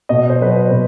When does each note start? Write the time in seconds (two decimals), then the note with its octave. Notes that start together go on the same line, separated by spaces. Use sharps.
0.09 B2 D#5
0.30 C5
0.40 F#3 B4
0.50 C5
0.71 B2 B4